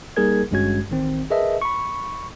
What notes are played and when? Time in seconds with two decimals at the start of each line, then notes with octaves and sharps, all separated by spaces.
0.17 G3 A#3 D#4 G#4 A#4 G#6
0.51 G#1 G2 G#3 C#4 F#4 G#6
0.90 A1 D#3 C4
1.30 G#4 A#4 B4 D#5 E5 A5
1.62 B5 C#6